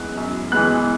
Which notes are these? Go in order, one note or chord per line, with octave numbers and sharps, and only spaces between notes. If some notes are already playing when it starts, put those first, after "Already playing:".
Already playing: F#2 E3 G#3 B3 F#6
F#2
E3 G#3 B3 F#6